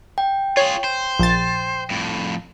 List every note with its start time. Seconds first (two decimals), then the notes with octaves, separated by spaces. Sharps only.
0.18 G5
0.57 F4 G#4 C#5
0.84 C5
1.19 A#1 A6
1.90 F2 A2